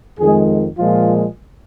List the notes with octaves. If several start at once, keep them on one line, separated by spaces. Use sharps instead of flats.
F2 D#3 G#3 G#4
A#2 F3 G#3 F4